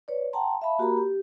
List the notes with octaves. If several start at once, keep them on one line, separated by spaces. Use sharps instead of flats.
B4 C#5 D5
F#5 G5 A5 A#5 C6
E5 F5 A5 B5
A#3 F#4 G4 A#4 A#5 B5
G4